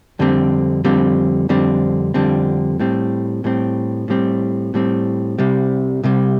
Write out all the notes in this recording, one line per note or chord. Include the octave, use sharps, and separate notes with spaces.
F2 D3 G3 C4
F2 D3 G3 C4
F2 D3 G3 C4
F2 D3 G3 C4
A2 G3 C4
A2 G3 C4
A2 G3 C4
A2 G3 C4
C2 C3 G3
C2 C3 G3